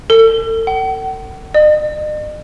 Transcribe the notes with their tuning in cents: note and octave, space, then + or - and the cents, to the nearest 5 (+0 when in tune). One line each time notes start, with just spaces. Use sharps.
A4 +40
F#5 +45
D#5 -45